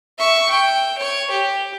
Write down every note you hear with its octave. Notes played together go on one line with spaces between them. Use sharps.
E5 C#6
G5
C#5
G4